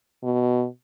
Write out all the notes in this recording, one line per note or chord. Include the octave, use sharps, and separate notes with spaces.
B2